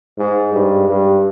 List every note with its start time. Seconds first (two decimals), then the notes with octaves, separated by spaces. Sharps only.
0.18 G#2
0.53 G2
0.88 G2